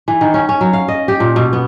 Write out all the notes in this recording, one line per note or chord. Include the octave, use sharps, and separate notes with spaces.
E3
D#3
C#4
C#4
F#3
F5
D#5
G4
A#2
B2
B3